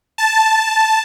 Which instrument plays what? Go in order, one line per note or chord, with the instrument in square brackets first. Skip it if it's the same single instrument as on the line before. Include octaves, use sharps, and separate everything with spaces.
[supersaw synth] A5